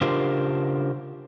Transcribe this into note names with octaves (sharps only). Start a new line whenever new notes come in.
C#3 D4 F4 G4 A#4 C5